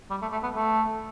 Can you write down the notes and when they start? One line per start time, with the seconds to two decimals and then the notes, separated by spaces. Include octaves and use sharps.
0.10 G3
0.22 A3
0.32 A3
0.43 B3
0.55 A3